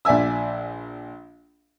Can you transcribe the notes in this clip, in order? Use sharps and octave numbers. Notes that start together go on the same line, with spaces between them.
A#1 D5 E5 G#5 E6